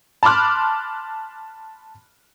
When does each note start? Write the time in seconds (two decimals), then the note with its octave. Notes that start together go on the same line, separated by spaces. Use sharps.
0.23 A5 B5 C6 D6 F6 F#6